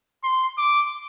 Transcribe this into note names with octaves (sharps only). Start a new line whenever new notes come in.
C6
D6